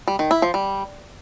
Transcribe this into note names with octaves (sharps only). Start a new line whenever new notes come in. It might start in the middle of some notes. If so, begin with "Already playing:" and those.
G3
D#3
E4
F3
G3